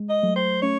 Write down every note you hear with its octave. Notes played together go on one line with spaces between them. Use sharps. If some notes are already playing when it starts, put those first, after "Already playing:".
Already playing: G#3
D#5
F#3 A3
C5
A3 C#4 C#5